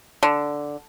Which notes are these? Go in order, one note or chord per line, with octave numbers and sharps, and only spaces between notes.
D3